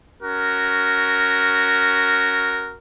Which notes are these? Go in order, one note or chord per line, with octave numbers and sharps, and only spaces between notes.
C#4 F#4 A#4